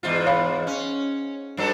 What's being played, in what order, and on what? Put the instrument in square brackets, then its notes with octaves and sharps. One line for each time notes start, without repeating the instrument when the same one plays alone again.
[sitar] E2 G#2 F4
[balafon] C#5 F5 B5
[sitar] C#4
G2 F#3 A4